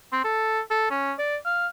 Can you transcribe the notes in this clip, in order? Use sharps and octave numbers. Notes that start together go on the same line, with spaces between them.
C4
A4
A4
C#4
D5
F5